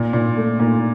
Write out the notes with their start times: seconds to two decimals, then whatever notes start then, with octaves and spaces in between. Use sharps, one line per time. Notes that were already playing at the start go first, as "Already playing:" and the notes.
Already playing: A#2
0.13 A#2
0.37 A3
0.60 A#2